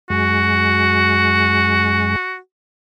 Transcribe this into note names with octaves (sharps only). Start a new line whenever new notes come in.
F#2 G#3 F#4